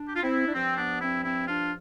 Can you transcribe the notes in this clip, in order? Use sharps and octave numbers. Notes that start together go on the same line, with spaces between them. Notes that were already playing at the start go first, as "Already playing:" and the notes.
Already playing: D4
G4
F4
C4 E4
D4
G2 F3 C4
B3 D4
C4 E4
C4 E4
D4 F4